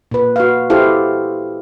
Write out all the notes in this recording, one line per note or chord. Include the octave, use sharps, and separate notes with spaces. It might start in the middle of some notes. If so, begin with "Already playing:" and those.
A#2 B4
F#4 B4 F5
E4 G4 A4 C5 F5